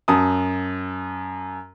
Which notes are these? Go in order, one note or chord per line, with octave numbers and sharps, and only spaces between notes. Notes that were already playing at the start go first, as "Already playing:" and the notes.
F#2 A5 D#6